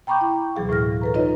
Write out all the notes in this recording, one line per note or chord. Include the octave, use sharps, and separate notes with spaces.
G5 A#5 B5 C#6 D6 G6
E4
D2 B2 E3 F#3 G#4 F5
A2 E3 E4 F6 A#6
A4 B4 A#5
D#4 F4 B4 C#5 D#5